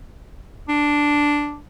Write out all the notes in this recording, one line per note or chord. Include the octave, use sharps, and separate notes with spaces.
D4